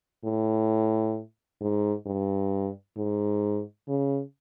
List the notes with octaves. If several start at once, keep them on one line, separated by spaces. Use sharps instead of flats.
A2
G#2
G2
G#2
C#3